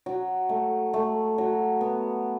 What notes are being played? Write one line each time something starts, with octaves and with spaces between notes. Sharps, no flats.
F#3
A3
A3
F#3
B3